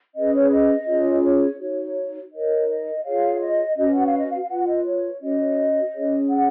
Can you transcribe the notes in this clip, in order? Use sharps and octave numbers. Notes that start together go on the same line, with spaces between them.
C#4 G#4 B4 D#5
C#5
D#5
C#4 F4 G#4 C#5
C#5
D#4 F#4 C#5
D#4 A#4 C#5 D#5
D#5
F4 G#4 C#5 F5
D#5
C#4 F#4 B4 D#5
F#5
F5
D#5
F5
F5
F4 B4 F#5
D#5
C#5
C#4 F#4 C#5 D#5
C#4 G#4 C#5
F#5